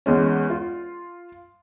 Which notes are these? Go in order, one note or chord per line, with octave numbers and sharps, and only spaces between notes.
E2 G#3 C#4
F4